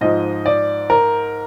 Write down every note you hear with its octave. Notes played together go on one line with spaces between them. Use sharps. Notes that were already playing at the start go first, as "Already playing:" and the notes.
G#2 F3 D#5
D5
A#4